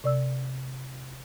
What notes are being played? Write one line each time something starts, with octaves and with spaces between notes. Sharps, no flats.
C3 D5 E6